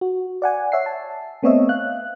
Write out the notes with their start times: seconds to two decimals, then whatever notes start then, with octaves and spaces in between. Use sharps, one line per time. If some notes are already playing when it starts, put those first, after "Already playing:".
0.01 F#4
0.42 D5 F#5 G#5
0.72 C#5 E5 F#5 C7
0.86 A5
1.43 A3 B3 C4 C#5 D#5 E5
1.69 F5 F#6